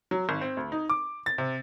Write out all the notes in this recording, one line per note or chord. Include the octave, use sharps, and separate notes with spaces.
F#3
G#1
C4
D2
D#4
D6
A6
C3